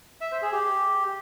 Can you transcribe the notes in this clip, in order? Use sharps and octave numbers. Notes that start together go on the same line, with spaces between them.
E5
C5
G#4
G4